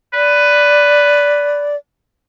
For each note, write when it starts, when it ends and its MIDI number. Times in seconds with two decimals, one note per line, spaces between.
0.14 1.71 71
0.14 1.76 74